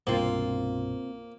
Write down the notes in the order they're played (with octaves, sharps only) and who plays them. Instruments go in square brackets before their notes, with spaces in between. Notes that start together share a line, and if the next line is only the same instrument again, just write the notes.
[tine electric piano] C2 G2 B2 [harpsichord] A#3 [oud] C4 F4